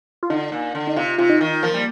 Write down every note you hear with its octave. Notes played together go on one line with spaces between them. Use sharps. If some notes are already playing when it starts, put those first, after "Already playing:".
F4
D3 D#4
A#2
D3
D#4
C3 F4
C3 F4
D#4
D#3
F3 A#3
G3